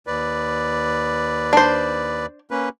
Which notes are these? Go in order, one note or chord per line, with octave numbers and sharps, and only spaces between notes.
D#2 B4 D5
D4 C5
A#3 C#4 B4